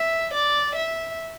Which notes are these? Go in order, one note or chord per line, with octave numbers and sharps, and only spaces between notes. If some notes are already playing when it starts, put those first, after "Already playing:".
Already playing: E5
D5
E5